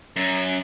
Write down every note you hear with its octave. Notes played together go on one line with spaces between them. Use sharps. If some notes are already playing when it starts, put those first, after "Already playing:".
F#2